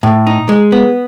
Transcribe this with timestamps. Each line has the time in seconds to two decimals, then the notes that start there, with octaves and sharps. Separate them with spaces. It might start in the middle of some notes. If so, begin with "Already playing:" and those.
0.03 A2
0.27 D#4
0.49 G#3
0.72 B3